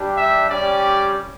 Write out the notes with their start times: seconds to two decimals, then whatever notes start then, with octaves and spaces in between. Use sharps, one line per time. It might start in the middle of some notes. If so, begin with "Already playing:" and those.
Already playing: G3 D4 G4
0.15 E5
0.49 G3 C#4 G4 D5